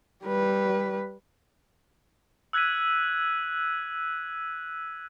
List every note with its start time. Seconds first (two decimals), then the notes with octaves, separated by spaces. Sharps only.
0.24 G3 B4
2.53 E6 F#6 G#6 B6 D#7